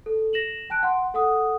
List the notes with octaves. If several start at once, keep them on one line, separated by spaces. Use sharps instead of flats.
A4
A#6 E7 F#7
G5 A5 F#6 D7
F#5 C6
A4 F#5 D#6